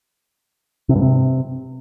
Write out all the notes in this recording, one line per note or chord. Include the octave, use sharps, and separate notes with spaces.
C3
G2
C3